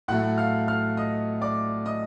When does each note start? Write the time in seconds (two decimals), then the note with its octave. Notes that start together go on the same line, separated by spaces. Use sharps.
0.08 A2 F#3 A3 F#5 F#6
0.38 F5 F6
0.68 F5 F6
0.97 D#5 D#6
1.41 D5 D6
1.86 D#5 D#6